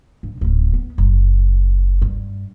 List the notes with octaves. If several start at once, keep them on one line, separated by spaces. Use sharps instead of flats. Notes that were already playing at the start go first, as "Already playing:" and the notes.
G2
D1 C#4
B3
F#1
G2